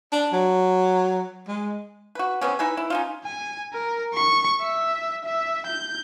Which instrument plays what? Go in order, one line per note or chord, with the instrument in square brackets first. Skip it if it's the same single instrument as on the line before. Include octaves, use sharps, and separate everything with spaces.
[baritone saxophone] D4
F#3
G#3
[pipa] F#4 B4
C3 E3 B3 C#4
D#4 E4 B4 G#5
E4
C#4 D#4 F4
[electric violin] G#5
A#4
C#6
E5
E5
G6